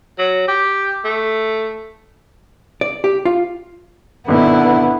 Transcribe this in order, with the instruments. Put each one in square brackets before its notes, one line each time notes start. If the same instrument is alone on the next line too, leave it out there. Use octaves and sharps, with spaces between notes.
[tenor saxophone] F#3
G4
A3
[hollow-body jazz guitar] D5
G4
F4
[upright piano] G#1 B2 [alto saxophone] D3 [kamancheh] B3 [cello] E4